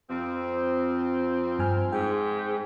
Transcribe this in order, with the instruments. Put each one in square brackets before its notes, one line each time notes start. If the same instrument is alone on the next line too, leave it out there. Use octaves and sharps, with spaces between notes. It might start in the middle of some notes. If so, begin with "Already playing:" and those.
[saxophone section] F2 F3 C4
[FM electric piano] G2 G#5 F6
[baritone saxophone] G#2 [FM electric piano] G5